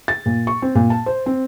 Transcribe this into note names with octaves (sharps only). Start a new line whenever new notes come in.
A6
A#2
C#6
C4
A#2
A5
C5
C4